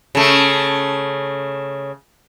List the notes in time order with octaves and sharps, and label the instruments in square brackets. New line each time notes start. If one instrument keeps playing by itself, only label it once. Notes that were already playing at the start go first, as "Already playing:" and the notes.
[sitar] C#3 A3